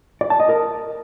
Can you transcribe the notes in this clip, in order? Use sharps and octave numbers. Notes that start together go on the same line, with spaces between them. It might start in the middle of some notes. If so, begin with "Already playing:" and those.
D5
A5
D#5
A#4